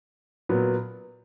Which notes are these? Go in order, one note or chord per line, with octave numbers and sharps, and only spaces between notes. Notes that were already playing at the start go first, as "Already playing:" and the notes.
A#2 F#3 B3